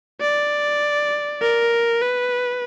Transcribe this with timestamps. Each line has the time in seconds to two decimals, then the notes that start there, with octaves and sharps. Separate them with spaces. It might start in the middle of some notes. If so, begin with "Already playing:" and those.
0.21 D5
1.41 A#4
2.02 B4